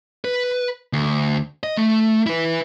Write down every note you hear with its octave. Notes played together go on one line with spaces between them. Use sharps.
B4
D2
D#5
A3
E4 B4